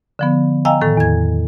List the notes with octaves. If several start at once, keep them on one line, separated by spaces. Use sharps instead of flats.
D3 F3 B3
D#5 F5 G5 G#5 A#5 E6
A2 D#3 A4
E2 G#6